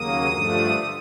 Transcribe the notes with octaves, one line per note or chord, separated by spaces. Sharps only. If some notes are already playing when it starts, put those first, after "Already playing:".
Already playing: D#2 C#3 F#3 A#3 D#6
G2 D3 F3 A3 D4